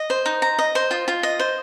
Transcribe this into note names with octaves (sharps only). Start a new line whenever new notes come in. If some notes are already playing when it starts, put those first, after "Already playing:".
Already playing: D#5
C5
D#4
A#5
D#5
C5
F4
F4
D#5
C5